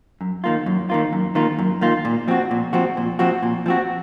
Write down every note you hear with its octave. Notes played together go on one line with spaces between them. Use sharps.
F#2
D#3 A#3 F4
F#2
D#3 A#3 F4
F#2
D#3 A#3 F4
F#2
D#3 A#3 F4
A#2
F3 C4 F#4
A#2
F3 C4 F#4
A#2
F3 C4 F#4
A#2
F3 C4 F#4